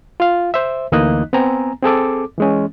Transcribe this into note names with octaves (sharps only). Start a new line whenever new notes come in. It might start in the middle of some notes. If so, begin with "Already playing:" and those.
F4 F5
C5 E5
D2 E3 A#3 D#4 D#5 F#6
B3 C4 G#5 A#5
C4 G#4 A4 D6
E3 G#3 C#4